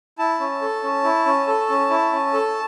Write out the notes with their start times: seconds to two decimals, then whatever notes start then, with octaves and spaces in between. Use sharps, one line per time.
0.19 E4 A5
0.40 C#4
0.62 A4
0.83 C#4
1.04 E4
1.26 C#4
1.48 A4
1.70 C#4
1.90 E4
2.12 C#4
2.34 A4